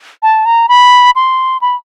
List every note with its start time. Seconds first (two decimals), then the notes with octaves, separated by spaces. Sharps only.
0.23 A5
0.46 A#5
0.69 B5
1.16 C6
1.62 B5